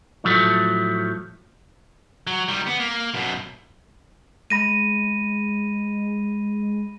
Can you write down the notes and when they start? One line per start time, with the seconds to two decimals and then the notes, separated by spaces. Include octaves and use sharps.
0.24 A2 F3 F#3 A3
2.27 F#3
2.48 D#3 G3
2.67 B3
2.80 A#3
3.14 F#2 B2
4.50 G#3 B5 A#6 D#7